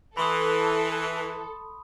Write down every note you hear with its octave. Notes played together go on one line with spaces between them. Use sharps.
E3 A4 B5 C6 D#6